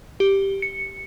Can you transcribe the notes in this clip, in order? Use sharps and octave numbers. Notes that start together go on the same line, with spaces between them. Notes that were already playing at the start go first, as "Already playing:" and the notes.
G4
C#7